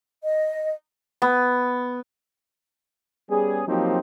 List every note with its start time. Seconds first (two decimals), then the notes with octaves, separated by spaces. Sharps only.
0.23 D#5
1.22 B3
3.30 G3 B3 C#4 G#4
3.67 F3 F#3 A#3 C4 D#4 G4